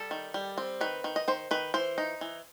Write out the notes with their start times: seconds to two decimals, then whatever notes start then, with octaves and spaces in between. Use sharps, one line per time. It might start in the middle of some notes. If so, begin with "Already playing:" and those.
Already playing: G3 A4
0.11 D#3
0.34 G3
0.58 C4
0.81 D#3 B4
1.04 D#3
1.16 D#5
1.28 D#3 C5
1.51 D#3 B4
1.74 E3 C5
1.98 D#4
2.21 E3